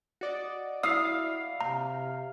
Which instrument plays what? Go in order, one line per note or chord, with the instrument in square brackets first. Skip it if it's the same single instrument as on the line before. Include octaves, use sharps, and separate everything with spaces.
[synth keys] F#4 D5 D#5
[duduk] E4 [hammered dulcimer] F5 [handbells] D#6 E6 C7
[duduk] C3 [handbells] A#5